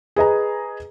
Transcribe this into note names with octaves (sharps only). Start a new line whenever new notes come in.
G#4 B4 D#5 A#5